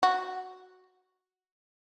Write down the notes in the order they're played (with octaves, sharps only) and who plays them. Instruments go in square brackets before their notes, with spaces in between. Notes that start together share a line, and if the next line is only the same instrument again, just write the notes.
[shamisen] F#4